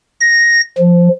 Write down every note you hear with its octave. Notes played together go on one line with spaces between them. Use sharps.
A#6
F3